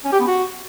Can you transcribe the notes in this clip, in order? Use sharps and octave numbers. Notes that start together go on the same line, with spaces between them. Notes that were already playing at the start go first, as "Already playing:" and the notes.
C#4
G4
B3
F#4